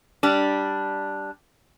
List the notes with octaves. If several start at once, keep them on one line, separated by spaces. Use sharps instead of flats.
G3 D4